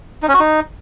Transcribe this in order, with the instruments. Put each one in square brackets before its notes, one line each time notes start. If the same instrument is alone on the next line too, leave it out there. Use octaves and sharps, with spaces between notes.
[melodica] D#4
C#4
F#4
D#4